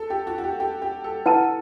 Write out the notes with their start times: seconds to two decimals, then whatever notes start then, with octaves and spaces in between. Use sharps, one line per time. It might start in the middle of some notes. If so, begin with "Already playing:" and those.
Already playing: A4
0.10 G4
0.27 F#4
0.38 F#4
0.44 G4
0.60 G4
0.82 G4
1.04 A4
1.26 E4 A4 B4 F#5 A5